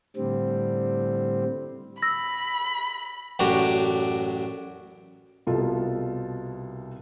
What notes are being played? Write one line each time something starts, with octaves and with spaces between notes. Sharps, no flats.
A2 D3 G3 C4
B5 E6 A#6
A1 F#2 D4 F#4 G4 A#5
C2 B2 F4 A4